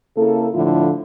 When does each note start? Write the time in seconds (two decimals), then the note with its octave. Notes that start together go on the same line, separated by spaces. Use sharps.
0.16 C#3 A#3 E4 A4
0.54 A2 D3 F3 E4 F4